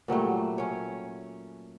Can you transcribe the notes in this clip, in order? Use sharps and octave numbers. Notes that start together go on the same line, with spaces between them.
A#2 F#3 G3 A3
C#4 C#5